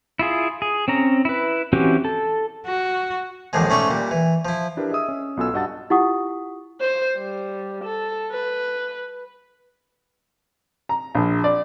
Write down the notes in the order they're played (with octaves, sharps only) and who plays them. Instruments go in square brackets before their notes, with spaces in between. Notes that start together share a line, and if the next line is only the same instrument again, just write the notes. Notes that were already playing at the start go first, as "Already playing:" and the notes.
[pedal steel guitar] E4 F4 G#4
G#4
C4 C#4 A#5
E4 B4
E3 C4 C#4 F#4 G4
A4
[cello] F#4
[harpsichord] A#1 D#2 G#2 D3 F3 G#3
G#2 A3 C#4 D5 E5 C#6
A#2 G3
E3
F3 E4
[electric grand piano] D4 E4 G4 A#4 B4
G#4 D#5 E5 D#6 E6
C#4
B1 B2 F4 A4 G#5 E6
G2 F#4 D#5 F#5 A5 A6
[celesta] E4 F4 G4 F#5 C#6 D#6
[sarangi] C5
G3
A4
B4
[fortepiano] A#5
A#1
D5